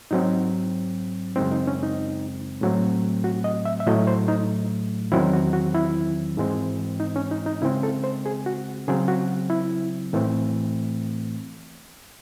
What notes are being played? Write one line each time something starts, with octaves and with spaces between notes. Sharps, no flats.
G#2 F#3 C4 D#4
F#2 C#3 G#3 C4 D#4
D#4
C#4
D#4
A2 F#3 A3 C4
F#4
D#5
E5
E5
A2 F#3 A3 D#5
C5
D#4
E2 D#3 F#3 C4 E4
F#4
F#4
E4
G#2 E3 G#3 C4
D#4
C#4
D#4
D#4
C#3 G#3 C4 E4
A4
C5
G#4
F#4
C#3 F#3 C4 G#4
F#4
E4
A2 E3 A3 C4